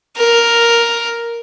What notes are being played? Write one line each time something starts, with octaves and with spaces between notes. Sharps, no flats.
A#4